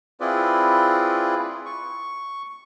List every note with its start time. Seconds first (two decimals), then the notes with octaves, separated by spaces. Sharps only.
0.21 C4 E4 F4 G#4 B4 D5
1.66 C#6